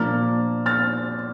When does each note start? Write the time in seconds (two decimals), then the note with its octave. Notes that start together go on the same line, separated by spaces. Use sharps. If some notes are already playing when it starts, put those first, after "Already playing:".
Already playing: A#2 F3 A#3 D4 F6 A6
0.66 F6 A6